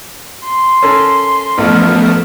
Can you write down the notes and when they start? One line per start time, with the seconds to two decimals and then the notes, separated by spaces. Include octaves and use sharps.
0.44 C6
0.82 C#4 A4 A#4
1.58 A1 F3 A3 B3 A#4